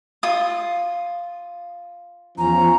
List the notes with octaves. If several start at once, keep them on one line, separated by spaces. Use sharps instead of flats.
F4 D#6
E2 F3 C#4 A#5